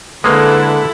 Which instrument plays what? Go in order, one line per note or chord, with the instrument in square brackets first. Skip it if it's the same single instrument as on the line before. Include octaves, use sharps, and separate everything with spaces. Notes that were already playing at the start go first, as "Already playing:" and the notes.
[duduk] D3 [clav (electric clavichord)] G#3 A#3 [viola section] E4 A4 [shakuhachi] B4